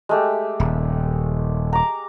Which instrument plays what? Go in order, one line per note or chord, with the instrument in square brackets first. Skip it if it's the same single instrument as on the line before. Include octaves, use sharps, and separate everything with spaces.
[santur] G#3 A3 G4
[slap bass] D#1
[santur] A#5 D6